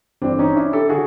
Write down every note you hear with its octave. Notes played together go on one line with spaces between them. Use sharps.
G1 G2 E3 C4 D4
C#4 D#4
D4 E4
G4 A4
D3 F#4 G#4